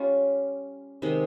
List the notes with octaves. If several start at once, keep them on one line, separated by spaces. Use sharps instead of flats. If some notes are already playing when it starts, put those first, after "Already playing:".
Already playing: G3 C#4 F4
C3 D#3 G#3